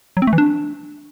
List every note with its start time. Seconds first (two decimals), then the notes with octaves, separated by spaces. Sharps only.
0.17 F#3
0.22 C4
0.27 A3
0.33 E3
0.38 D4